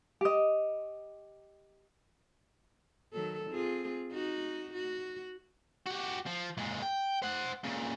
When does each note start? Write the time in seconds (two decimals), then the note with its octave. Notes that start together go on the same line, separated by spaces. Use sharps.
0.21 G4 D#5
3.13 D#3 F#3 A4
3.50 C4 F4 G#4
4.12 D#4 F#4
4.74 F#4
5.86 F#4 G4
6.26 F3
6.57 A#2 G#3
6.82 G5
7.22 C5 F#5
7.64 A#2 C#3